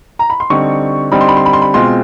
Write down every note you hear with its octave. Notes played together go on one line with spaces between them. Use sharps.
A#5
B5
C6
D3 G3 C4 D#4 C#6
D3 G3 C4 D#4 B5
C6
B5
C6
B5
C6
B5
B2 G#3 C4 F4 C6